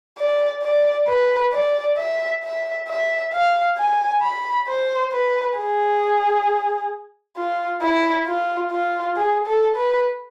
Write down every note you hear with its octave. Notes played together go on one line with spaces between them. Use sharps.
D5
D5
B4
D5
E5
E5
E5
F5
G#5
B5
C5
B4
G#4
F4
E4
F4
F4
G#4
A4
B4